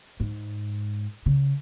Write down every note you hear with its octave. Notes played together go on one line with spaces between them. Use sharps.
G#2
C#3